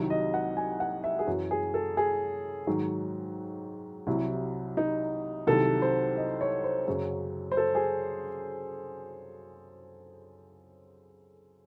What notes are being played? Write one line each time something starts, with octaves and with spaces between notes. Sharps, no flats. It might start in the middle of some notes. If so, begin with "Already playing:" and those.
Already playing: C2 C3 D#3 F#3
D#5
F#5
G#5
F#5
E5
G#4
F#2 E3 F#4
G#4
A4
G#4
G#2 D#3 F#3
C2 C3 F#3 E4
D#4
C2 C3 D#3 F#3 A4
C5
D#5
C#5
C5
F#2 C#3 F#3
C5
A4
G#4